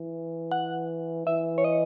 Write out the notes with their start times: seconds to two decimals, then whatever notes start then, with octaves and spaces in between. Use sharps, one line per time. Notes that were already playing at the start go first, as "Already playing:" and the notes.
Already playing: E3
0.52 F#5
1.27 E3 E5
1.58 C#5
1.64 D#5